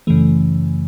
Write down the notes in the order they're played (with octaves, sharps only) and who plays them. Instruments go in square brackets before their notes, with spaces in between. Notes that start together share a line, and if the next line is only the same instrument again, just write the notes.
[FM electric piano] F#2 C#3 E3 A3